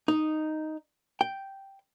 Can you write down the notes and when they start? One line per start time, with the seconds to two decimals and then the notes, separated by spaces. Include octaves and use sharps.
0.08 D#4
1.21 G5